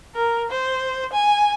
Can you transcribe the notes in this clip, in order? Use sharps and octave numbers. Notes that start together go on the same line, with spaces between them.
A#4
C5
G#5